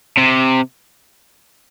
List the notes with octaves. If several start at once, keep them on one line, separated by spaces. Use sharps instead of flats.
C3